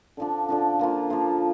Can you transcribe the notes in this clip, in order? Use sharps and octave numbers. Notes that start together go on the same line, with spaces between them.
D3 F3 D4
D3 F3 D4
F3 A#3 F4
F3 A#3 F4